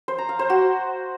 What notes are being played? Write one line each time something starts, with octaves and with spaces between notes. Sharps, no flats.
C5
A#5
F5
C5
F#4